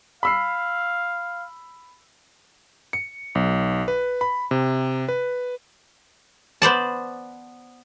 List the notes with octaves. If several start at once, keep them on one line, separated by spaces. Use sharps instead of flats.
F5 B5 E6 C7
C#7
B1
B4
B5
C3
B4
B3 C5 D5 A5